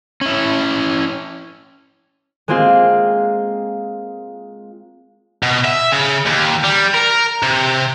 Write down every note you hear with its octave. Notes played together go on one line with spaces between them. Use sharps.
C#4 E4
G#3 A#3 C4 F4 G#4
B2
E5
C#3
D#2
G3
A#4
C3